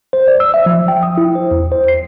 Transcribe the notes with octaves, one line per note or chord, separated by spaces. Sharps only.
C5
D5
E6
E5
F3
G5
D#6
E4
C5
E2
C5
C7